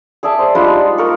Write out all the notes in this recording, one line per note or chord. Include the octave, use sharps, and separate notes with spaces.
G#4 D5 E5 A5
C5 D5
G3 G#3 D4 F4
D#4
A#3 A#4 C#6